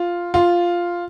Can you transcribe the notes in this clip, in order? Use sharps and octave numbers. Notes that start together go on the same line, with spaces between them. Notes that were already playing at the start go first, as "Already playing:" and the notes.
Already playing: F4
F4